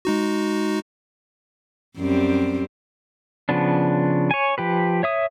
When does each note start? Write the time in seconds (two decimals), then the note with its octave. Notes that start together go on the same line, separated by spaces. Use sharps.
0.05 G#3 D#4 F#4
1.98 F#2 G3 C4
3.49 C#3 F3 B3 D4
4.31 C#5 G#5
4.58 F3 G4 B4
5.03 C#5 E5 D#6